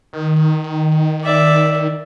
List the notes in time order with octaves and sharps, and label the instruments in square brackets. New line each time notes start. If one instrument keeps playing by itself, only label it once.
[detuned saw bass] D#3
[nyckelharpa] D5 E5